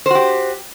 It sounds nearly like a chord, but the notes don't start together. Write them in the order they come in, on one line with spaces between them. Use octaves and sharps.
C5 F#4 G4